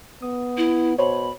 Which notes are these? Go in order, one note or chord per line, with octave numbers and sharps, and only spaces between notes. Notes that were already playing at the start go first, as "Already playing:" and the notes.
B3 D#6
E4
B2 C5 C#5 B5